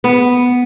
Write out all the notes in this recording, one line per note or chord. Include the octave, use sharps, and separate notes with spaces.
B3